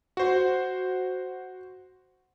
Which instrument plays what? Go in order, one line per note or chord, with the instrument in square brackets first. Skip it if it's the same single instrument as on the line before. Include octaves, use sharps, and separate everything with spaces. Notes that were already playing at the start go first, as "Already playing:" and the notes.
[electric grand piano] F#4 C5